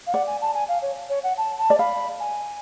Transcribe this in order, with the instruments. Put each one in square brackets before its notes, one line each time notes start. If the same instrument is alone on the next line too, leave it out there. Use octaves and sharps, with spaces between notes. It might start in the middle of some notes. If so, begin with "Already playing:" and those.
[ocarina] F5
[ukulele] D5 [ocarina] F#5
[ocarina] G#5
A5
G#5
F5
C#5
C#5
F#5
A5
A5
[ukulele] D5
[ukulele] F5 [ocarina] B5
[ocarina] G#5